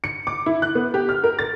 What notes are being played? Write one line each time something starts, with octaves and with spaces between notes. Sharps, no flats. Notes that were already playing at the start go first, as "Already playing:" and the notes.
C#7
D6
E4
F#6
B3
G4
F6
A#4
A6